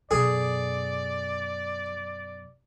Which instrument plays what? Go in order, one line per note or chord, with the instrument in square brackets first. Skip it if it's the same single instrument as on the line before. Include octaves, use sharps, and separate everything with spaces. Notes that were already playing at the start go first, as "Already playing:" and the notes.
[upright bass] F#2 B2 [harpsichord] G#4 [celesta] A4 [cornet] D5